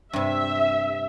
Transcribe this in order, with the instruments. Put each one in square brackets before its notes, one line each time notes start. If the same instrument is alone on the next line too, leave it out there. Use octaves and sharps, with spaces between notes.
[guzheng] G2 C3 [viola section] E5